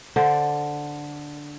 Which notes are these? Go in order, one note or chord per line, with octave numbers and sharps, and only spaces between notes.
D3 C5 D5